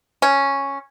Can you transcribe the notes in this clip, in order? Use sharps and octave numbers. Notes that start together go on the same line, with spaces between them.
C#4